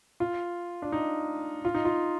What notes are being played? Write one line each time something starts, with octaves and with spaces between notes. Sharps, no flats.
F4
D4
D#4
F4
D#4
F4